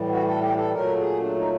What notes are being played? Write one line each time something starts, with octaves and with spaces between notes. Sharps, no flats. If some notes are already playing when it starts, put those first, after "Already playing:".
Already playing: A2 E3 G3
F#4
A4
G4
A4
A#2 F#3 A3 A#4
G#4
D4
D#4